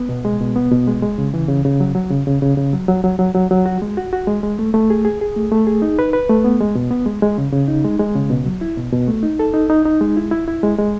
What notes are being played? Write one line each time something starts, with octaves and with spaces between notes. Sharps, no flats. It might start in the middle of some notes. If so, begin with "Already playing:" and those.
Already playing: B3
B2
G#3
B2
B3
B2
G#3
G#3
C#3
E3
C#3
C#3
F#3
F#3
C#3
C#3
C#3
C#3
F#3
F#3
F#3
F#3
F#3
F#3
F#4
G#3
F#4
F#4
G#3
G#3
A3
A3
G#4
G#4
G#4
A3
A3
G#4
D#4
B4
B4
A3
B3
G#3
B2
B3
G#3
G#3
C#3
C#3
D#4
G#3
G#3
C#3
B2
F#3
E4
B2
B2
A3
D#4
A4
D#4
D#4
D#4
G#3
E4
E4
E4
G#3
G#3